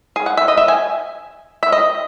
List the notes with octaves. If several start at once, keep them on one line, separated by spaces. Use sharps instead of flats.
G#4
F#5
E5
D#5
E5
G#5
E5
D#5